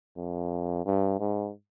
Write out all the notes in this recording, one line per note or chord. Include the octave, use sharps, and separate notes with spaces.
F2
G2
G#2